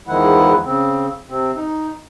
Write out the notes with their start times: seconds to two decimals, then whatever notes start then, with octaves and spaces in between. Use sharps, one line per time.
0.08 E2 D#3 F3 G#3 E4 F#5
0.64 C#3 C4
1.29 C3 C4
1.56 D#4